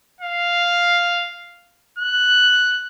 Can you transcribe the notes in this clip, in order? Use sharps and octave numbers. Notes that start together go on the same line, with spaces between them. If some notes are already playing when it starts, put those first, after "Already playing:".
F5
F#6